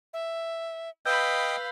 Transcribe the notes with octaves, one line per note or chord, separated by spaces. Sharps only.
E5
B4 D#5 F5 G5 B5 E6 G6